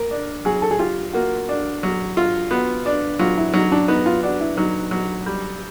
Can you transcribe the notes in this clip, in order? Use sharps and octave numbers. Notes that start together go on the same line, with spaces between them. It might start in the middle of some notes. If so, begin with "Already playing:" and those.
Already playing: A#3 A#4
D4
F#3 G#4
A4
G#4
F4 G4
A#3 F#4
D4
F#3
F4
B3 F#4
D4
F#3 F4
E4
F#3 D#4
D4
B3 D#4
F4
D4 F#4
E4
F#3 D#4
F#3
G3